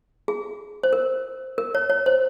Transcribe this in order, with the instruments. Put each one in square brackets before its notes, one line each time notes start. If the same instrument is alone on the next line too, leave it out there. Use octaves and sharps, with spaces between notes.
[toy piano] G#4
C5
A#4
A#4
C#5
C#5
C5